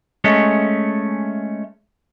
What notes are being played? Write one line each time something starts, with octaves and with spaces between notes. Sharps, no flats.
G#3 A3 C#4